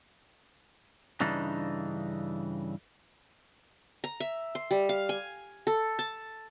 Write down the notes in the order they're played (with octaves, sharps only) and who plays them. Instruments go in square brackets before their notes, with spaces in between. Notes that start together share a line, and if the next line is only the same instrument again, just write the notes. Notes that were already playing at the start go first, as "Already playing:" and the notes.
[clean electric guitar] G2 C#3 E3 D4 D#4
[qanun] A#5
E5
C6
G3
F5
G#5
A4
A5